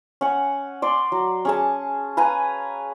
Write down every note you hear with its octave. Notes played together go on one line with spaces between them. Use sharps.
C#4 F#5
D5 C6
F#3
C#4 G#4 A5
B4 F5 G#5 A#5